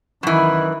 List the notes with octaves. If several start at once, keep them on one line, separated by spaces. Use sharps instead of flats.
F#2 D#3 E3 E4